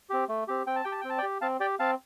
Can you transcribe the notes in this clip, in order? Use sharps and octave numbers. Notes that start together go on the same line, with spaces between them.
C4 G4
A3
C4 G4
C4 G5
A5
G4 G5
A5
C4 G5
A5
D5 G5
G4
C4 F5 A5
G4 D5 G5
C4 F5 A5